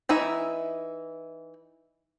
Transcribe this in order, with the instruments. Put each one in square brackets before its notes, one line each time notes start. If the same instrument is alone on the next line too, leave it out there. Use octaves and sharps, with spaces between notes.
[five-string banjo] E3 D#4 E4 E5